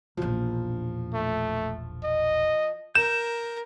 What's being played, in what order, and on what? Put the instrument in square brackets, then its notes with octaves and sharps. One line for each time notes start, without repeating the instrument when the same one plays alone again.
[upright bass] E1 A#1 [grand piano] F3
[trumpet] A3
D#5
[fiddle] A#4 [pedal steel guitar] G6 [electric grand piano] E7